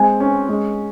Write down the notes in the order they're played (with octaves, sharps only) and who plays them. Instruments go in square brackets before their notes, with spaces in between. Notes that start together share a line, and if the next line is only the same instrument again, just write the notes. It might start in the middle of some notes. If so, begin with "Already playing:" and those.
Already playing: [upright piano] G#3 C4 [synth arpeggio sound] G#5
[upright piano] C#4
G#3